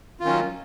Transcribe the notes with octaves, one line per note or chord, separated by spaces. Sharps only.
D#3 F#3 C#4 F4